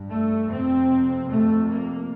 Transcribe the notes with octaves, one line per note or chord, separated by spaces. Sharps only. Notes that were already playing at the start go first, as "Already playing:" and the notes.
Already playing: G2
A3
F2 C3 C4
F2 C3 A3
A#3